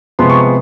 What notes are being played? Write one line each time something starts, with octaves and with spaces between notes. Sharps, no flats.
C3 F3 G#3 B3 C6
C#6
C#6